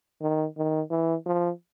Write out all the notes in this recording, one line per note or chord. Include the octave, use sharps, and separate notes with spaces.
D#3
D#3
E3
F3